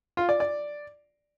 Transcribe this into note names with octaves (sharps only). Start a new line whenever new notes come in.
F4
D5
D5